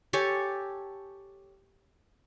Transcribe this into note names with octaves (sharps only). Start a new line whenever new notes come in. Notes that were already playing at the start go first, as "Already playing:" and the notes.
G4 A4 C#5 G#5